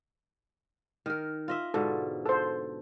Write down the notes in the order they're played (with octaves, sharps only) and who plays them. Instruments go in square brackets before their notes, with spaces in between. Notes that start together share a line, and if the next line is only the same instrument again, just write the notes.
[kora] D#3 A#4
F4 D#5 E5
[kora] G#2 B2 D3 [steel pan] A4
[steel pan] A4 C5